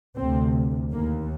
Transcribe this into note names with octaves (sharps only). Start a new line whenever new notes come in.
D2 C3 C4
D#2 A#3